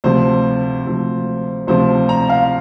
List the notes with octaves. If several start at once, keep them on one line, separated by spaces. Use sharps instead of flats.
D2 C3 F3 C5
D2 C3 F3
D2 C3 F3 C5
A#5
F5